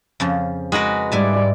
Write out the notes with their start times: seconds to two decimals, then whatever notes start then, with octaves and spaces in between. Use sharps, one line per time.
0.20 F2 C#3 F3
0.72 G#3 F#4 G#4 A#4 B4
1.12 G#2 G3 E4 D5 G#5 A5